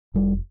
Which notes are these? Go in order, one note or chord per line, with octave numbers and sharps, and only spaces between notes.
F1 G3